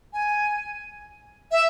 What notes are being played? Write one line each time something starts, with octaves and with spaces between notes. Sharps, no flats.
G#5
E5